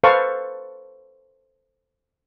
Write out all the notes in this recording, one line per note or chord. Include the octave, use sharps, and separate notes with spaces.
A4 B4 C5 F5 A5 C#6